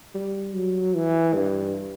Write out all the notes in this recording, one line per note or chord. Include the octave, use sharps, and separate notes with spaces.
G3
F#3
E3
G2